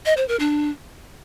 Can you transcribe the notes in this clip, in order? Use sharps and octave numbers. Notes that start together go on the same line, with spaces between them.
D#5
C5
A#4
D4